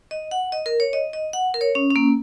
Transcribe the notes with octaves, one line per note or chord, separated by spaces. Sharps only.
D#5
F#5
D#5
A#4
C#5
D#5
D#5
F#5
A#4
C#5
C#4
C#4
A#3